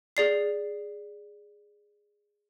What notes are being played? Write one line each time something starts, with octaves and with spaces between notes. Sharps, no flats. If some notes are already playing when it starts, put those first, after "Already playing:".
G#4 D5 C7